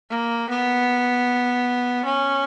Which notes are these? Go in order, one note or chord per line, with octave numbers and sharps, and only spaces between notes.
A#3
B3
C#4